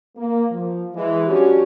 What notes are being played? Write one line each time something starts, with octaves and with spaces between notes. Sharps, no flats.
A#3
F3
E3 G#3
F#3 C#4 D4 F#4 G4